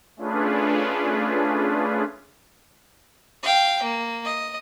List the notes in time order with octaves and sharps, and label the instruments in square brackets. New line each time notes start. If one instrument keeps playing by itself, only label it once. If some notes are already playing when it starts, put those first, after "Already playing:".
[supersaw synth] A3 C#4 D4 F4 G#4 B4
[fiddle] F5 G5
A#3
D#5